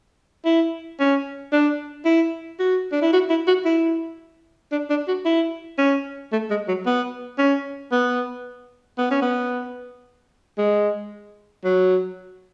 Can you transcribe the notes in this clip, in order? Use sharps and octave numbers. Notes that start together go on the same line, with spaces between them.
E4
C#4
D4
E4
F#4
D4
E4
F#4
E4
F#4
E4
D4
D4
F#4
E4
C#4
A3
G#3
F#3
B3
C#4
B3
B3
C#4
B3
G#3
F#3